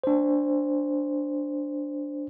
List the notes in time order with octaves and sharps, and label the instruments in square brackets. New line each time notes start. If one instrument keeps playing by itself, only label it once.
[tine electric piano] D4 C5